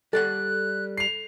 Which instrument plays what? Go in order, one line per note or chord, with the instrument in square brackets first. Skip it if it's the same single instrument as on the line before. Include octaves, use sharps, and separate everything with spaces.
[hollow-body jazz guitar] G3 D5 F#5 [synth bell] A4 [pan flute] F#6
[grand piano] C7 F7